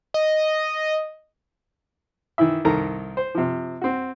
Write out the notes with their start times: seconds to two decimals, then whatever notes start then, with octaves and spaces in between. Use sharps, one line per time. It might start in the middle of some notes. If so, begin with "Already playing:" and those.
0.14 D#5
2.38 D#3 E3 E4 E5
2.65 C2 D#3 A4 A#4 A#5
3.17 C5
3.35 C3 F3
3.81 C4 F#4